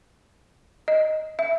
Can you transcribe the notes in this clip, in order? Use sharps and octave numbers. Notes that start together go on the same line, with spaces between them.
D#5
E5